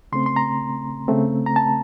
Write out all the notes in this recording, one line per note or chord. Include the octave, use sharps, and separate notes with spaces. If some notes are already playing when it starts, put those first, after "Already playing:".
C#3 A3 C4 C6
C6
A#5
C#3 A3 C4
A#5
A5